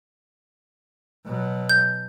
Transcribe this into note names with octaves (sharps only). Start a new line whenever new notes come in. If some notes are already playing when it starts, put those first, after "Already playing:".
B2 F#3
G6